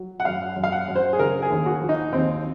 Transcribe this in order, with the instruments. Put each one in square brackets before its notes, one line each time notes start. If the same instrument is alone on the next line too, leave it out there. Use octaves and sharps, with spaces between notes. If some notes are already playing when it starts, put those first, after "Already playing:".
Already playing: [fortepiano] F#3
F#5
F#2 F5
F#2
F5
F#5
F#2
C5
G#4
C#3 A#4
G#4
D#2
F#4
F3
D#4
D#2 C4